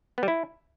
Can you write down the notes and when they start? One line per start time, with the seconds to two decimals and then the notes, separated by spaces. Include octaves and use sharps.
0.18 B3
0.23 G3
0.28 E4